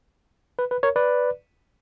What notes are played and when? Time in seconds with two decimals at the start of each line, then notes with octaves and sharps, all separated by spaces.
0.59 B4
0.71 B4
0.83 A#4 C#5
0.96 B4 D5